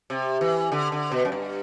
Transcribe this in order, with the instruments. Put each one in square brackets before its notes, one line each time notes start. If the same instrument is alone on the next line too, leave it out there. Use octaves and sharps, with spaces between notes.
[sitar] C3
E3
D3
D3
B2
F#2
G2